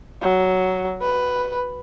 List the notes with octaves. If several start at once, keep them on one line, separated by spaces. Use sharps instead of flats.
F#3
B4